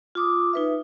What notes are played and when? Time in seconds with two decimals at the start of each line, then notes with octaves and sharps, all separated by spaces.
0.15 F4 D6 D#6
0.53 D#4 B4 E5